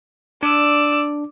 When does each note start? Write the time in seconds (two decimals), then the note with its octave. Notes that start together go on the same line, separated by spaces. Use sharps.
0.43 D4 D5 E6